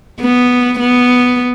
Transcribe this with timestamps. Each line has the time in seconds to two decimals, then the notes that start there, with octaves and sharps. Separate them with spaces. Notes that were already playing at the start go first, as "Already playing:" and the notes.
0.21 B3
0.80 B3